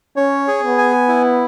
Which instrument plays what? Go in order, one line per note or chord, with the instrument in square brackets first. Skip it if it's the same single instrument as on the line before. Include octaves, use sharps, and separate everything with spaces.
[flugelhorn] C#4 [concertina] C#5
[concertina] G#4
[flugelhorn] B3
[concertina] G#5
E4